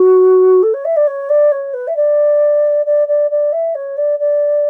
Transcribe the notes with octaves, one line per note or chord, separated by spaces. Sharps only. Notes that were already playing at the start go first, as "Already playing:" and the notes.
Already playing: F#4
A4
C#5
E5
D5
C#5
D5
C#5
B4
E5
D5
D5
D5
D5
E5
C#5
D5
D5